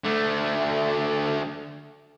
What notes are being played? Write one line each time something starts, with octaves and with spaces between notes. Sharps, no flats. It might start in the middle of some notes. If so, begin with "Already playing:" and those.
D3 A3